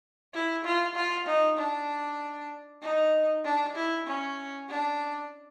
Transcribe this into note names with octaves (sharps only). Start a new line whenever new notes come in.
E4
F4
F4
D#4
D4
D#4
D4
E4
C#4
D4